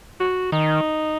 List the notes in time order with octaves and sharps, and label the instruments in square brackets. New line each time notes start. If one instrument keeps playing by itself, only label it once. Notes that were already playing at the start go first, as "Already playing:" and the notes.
[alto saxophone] F#4
[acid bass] D#3 [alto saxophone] D#4